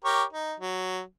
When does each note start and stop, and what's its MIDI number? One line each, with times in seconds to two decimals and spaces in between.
0.05 0.23 67
0.05 0.23 70
0.05 0.23 73
0.33 0.54 63
0.60 1.00 54